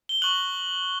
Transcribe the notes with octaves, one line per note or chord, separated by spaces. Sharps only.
G7
C#6 F#6 F#7